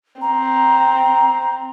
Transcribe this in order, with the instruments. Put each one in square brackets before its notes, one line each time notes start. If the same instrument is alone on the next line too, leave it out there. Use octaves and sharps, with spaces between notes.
[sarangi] C4 [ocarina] A#5